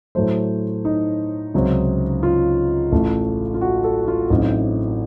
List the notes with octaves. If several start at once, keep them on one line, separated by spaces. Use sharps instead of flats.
A2 F#3 A3 C5
D#4
C#2 C3 F#3 C4
F4
A1 A2 A3
F4
F#4
A4
F4
A1 A2 F#3 C4 D#4